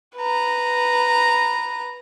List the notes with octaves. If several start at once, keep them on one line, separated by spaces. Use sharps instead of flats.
B4 A#5